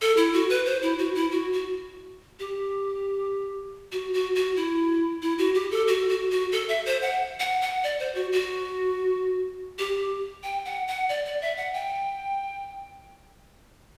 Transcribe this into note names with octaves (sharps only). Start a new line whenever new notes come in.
A4
E4
F#4
B4
C5
E4
F#4
E4
F#4
F#4
G4
F#4
F#4
F#4
E4
E4
F#4
G4
A4
F#4
F#4
F#4
A4
E5
C5
F#5
F#5
F#5
D5
C5
F#4
F#4
G4
G5
F#5
F#5
D5
D5
E5
F#5
G5